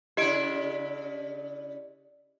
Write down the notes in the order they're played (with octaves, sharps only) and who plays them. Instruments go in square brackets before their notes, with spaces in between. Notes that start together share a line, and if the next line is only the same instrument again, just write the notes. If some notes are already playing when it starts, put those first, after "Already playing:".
[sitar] C#3 D4 E4 [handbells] G4 D#5 D7